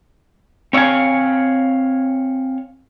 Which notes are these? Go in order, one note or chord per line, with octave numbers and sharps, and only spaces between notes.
C4 C#5 E5 F5 G#5